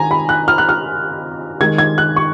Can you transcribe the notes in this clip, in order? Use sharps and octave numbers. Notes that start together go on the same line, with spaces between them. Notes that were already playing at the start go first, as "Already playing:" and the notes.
Already playing: D#3 G#5 A#5
B5
F#6
F6
F#6
F6
D#3 G#3 D#4 G#6
G#6
F#6
C#6